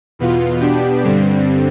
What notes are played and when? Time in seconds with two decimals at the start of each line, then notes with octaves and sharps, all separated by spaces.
0.19 E2 B2 B3 F4
0.60 B2 B3 D4 G4
1.03 G2 D3 G3 C4